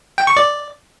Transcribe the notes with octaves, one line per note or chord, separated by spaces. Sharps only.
G5
C#6
D5